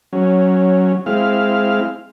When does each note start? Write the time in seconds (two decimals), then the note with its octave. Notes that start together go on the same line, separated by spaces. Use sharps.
0.13 F#3 C#4
1.06 G#3 C4 E4 F5